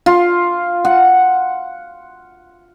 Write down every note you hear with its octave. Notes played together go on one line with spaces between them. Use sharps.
F4
F#5